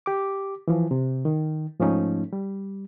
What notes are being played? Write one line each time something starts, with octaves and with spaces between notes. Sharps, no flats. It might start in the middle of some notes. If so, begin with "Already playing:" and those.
G4 D6
E3 F3
C3
D#3
G#2 F3 A3 C#4 D#4
G3